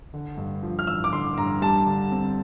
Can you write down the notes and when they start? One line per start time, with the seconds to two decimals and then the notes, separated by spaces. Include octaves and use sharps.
0.14 D3
0.37 G2
0.63 F3
0.79 F6
0.87 A1 E6
1.04 D6
1.12 D3 C6
1.38 G2 A#5
1.62 G3 A5
1.86 D3
2.11 C4